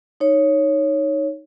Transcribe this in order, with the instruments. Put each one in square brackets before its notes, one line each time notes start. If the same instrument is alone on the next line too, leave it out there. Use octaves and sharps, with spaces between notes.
[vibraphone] D#4 C#5